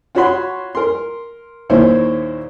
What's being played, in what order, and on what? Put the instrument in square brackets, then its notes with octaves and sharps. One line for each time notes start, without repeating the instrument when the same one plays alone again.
[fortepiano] F4 F#4 C#5 F#5 B5 C6
A#4 C6
D#2 A#2 A#3 E4 C5 C#5